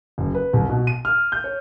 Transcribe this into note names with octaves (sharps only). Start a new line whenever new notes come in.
F#1
B4
C2
B2
D#7
F6
G6
C#5